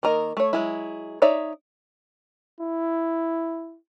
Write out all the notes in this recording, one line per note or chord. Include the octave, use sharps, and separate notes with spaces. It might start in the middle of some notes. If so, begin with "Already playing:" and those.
D#3 A#3 A#4 D#5
A3 C#5
F#3 G#3 E4
D#4 C#5 D5 E5
E4